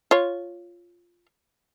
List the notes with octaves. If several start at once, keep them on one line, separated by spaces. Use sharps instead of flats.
F4 C#5